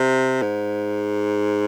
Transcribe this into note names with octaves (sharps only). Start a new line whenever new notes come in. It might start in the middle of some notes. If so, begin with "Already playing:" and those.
Already playing: C3
G#2